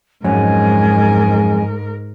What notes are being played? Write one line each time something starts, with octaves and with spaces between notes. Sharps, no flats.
F2 G#2 F#3 G#3 C#4 A#4 G#5